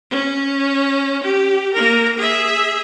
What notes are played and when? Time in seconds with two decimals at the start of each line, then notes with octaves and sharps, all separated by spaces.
0.11 C#4
1.23 G4
1.73 A#3 A#4
2.17 G#4 E5